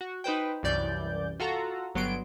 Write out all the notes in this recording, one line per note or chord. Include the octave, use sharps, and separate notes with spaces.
F#4
D#4 B4 C5 G5
C2 F#2 E3 D5 G6
F4 F#4 A4 A#5
G1 F#3 B3 C6 D7